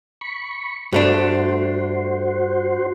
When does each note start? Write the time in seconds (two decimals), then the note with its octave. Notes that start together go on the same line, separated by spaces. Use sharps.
0.21 B5 C#6
0.92 G2 A3 D4 F#4 C5